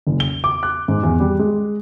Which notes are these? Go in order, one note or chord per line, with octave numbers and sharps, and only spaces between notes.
F#1
G7
D6
F#6
G#2
E2
G3
G#3